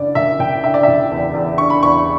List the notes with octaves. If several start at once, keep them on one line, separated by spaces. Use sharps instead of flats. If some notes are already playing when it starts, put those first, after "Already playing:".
Already playing: F#1 D3 D5
F#1 E5
F#1 G5
D3 E5
D5
F#1 E5
E2
E2
D3 C#6
B5
E2 C#6